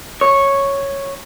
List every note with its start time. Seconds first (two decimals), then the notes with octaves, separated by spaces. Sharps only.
0.21 C#5